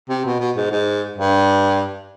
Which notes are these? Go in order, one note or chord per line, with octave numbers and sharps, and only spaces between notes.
C3
B2
B2
G#2
G#2
G2